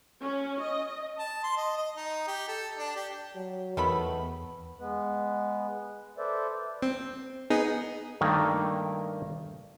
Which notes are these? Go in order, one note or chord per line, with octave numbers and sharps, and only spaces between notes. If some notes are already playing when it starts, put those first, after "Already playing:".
C#4
D#5
A5
C6
D#5
D#5
D#4
G4
A4
D4
G4
F#3
E2 D#3 A3 B3 B5
G#3 B3 B4
A4 B4 C5 D5 E5
C4
B3 D#4 G#4
G2 D#3 A3 A#3 A#5